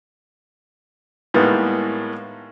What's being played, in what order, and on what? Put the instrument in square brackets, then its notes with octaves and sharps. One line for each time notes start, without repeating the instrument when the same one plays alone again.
[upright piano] A2 D#3 G3 G#3 A#3 B3